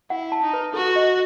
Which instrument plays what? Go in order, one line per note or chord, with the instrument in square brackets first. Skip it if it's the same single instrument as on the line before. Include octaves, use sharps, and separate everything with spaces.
[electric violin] E4 [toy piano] F#5
[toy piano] A5
[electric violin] D#4
[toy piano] B4
[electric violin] F#4 [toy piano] A4
[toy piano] D#5